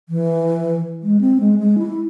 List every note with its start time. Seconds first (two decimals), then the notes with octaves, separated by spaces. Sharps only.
0.09 E3
1.03 G#3
1.21 C4
1.40 G#3
1.59 G#3
1.78 E4